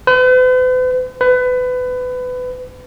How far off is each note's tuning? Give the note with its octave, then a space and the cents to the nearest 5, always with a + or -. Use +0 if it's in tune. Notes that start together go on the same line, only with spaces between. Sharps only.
B4 +45
B4 +25